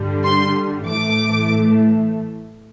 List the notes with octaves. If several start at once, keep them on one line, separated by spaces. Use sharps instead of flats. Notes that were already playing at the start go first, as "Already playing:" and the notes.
Already playing: G2 D3 G3
C6
A2 E3 A3 D6